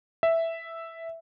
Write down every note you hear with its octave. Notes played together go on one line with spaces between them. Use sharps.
E5